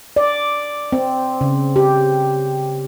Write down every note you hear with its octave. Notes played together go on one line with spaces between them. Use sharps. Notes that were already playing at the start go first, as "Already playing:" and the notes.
D5
C4
C#3
G4